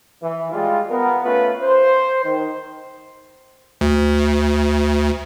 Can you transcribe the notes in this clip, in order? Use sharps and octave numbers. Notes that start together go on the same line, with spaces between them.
E3
G3 G#3 F4
B3 A#4
A3 C#4 F4 B4
C5
D#3
D2